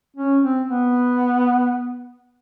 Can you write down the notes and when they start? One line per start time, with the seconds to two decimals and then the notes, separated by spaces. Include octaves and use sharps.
0.17 C#4
0.43 C4
0.68 B3